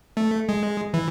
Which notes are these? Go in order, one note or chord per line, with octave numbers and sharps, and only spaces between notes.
A3
G#3
E3